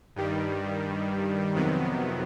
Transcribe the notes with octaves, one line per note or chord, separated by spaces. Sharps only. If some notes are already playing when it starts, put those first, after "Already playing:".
G2 D#3 G3
F2 C3 D#3 F#3 B3